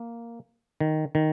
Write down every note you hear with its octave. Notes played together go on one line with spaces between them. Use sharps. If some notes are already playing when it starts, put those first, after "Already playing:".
Already playing: A#3
D#3
D#3